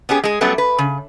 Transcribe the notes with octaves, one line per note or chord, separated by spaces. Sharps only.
B3 C#4 G4 G#4
G#3 G#4
F#3 G3 A3 B3 C#4
B4
C#3